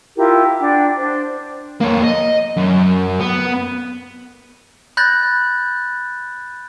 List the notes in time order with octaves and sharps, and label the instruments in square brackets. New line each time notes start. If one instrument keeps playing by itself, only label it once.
[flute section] E4 F4 G4 A#4
D4 F#5 G5
D4 C5
[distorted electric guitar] A#3 C#5
D#5
F#2
B3
[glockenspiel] B5 F#6 G6 A6 A#6